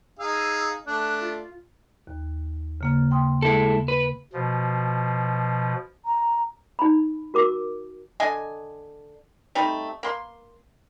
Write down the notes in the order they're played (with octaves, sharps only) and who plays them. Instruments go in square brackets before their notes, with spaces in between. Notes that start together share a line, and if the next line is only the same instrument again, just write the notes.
[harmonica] D#4 G#4 F5 [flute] E6
[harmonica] A3 D4 [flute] F#6
[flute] F4
[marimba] D#2
C#3 A#3 F6
G5 C6 D#6
[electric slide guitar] G#3 E4 A4
B4
[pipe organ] B2 F3
[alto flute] A#5
[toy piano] D#4 B5
F#4 A#4 D6
[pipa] D3 D#5 G#5
G3 A3 C4 D#4
A#3 C6